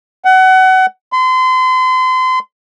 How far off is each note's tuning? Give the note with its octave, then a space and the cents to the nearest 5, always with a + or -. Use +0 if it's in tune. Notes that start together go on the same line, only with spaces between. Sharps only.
F#5 +25
C6 -35